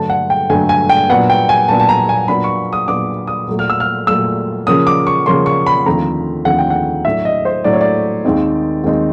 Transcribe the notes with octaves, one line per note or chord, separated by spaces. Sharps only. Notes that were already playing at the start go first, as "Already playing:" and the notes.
Already playing: G2 D3 F#3 A3 A5
F#5
G5
G2 D3 F#3 A3 G#5
G#5
G5
A#2 F#3 B3 D4 F#5
G5
G#5
A#2 F#3 B3 D4 A5
A5
A#5
G#5
A#2 F#3 B3 D4 B5
C#6
D#6
A#2 F#3 B3 D4 D6
D#6
A#2 F#3 A3
F6
E6
F6
A#2 F#3 A3 E6
C#3 F3 A#3 C#4 D#6
D6
C#6
C#3 F3 A#3 C#4 C6
C#6
B5
D#2 D3 F3 A3 C4 A#5
D#2 D3 F3 A3 C4 F#5
G5
F#5
A2 F#3 A3 D4 E5
D#5
C5
A2 F#3 A3 D4 D5
C#5
D5
D#2 D#3 G#3 C4 D#4
D#2 D#3 G#3 C4 D#4